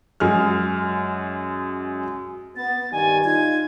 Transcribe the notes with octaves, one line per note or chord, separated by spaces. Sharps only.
F#2 G#3 G#4 F6
B3 A6
G2 D#3 G3 G#5
D#4 F4 G#6